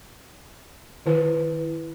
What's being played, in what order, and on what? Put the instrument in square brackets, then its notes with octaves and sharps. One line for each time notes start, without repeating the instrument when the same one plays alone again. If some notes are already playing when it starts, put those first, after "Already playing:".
[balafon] D#3 E4 B4